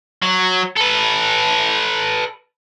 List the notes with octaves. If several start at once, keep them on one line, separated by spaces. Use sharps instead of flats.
F#3
A4 B4